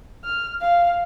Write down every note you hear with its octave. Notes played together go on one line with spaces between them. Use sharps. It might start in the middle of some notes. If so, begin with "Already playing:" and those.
F6
F5